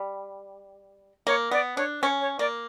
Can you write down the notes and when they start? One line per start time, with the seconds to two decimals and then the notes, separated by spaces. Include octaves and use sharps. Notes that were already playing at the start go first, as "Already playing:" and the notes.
Already playing: G3
1.27 A#3 C#5
1.51 B3 D5
1.76 D4 C#5
2.01 C#4 C#5
2.21 C#5
2.39 A#3 D5